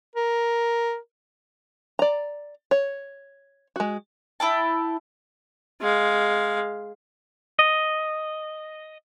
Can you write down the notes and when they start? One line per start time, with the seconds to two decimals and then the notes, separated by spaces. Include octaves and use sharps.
0.15 A#4
1.99 D5 A#5
2.71 C#5
3.76 G#3 F#4
4.40 E4 G5 A5
5.81 G#3 F5
7.59 D#5